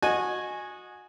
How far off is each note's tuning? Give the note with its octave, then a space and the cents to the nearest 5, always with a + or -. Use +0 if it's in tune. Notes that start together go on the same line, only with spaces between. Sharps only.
F#4 -20 D#5 -15 G#5 +0